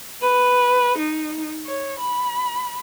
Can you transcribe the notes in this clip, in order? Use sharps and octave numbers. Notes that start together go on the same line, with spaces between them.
B4
D#4
C#5
B5